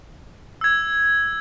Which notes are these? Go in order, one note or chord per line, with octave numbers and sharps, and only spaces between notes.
E6 G#6